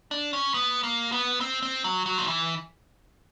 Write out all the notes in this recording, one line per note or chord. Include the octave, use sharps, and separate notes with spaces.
D4
C#4
B3
A#3
B3
C4
C4
F#3
F#3
F3
E3